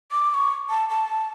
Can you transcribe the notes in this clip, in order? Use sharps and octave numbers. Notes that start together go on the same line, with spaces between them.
D6
D6
C#6
A5
A5